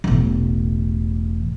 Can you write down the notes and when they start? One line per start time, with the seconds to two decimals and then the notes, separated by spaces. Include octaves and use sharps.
0.04 E1 A1